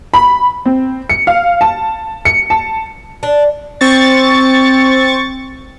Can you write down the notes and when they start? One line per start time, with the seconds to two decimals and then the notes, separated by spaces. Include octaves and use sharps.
0.14 B5
0.66 C4
1.10 C#7
1.27 F5
1.61 A5
2.25 C#7
2.50 A5
3.23 D4
3.81 C4 C#6 A6